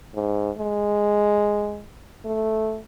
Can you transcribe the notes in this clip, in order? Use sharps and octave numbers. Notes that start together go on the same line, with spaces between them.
G#2
G#3
A3